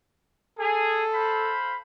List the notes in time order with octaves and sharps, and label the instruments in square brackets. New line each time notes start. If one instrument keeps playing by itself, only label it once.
[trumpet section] G#4 [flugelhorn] A4
[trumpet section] C5 F5 B5